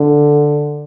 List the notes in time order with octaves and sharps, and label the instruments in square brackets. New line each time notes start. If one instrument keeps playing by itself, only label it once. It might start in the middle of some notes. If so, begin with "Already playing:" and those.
Already playing: [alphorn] D3